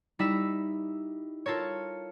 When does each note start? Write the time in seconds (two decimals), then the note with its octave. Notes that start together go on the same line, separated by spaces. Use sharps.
0.19 G3 D#4 E4 E5 E6 B6
1.46 F4 A4 A#4 C#5